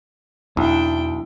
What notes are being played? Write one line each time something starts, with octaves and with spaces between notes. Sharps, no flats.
B1 E2 F#3 D4 E4 G5